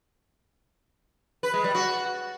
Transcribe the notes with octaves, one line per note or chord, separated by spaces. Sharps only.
B4
G#3
G3
F#4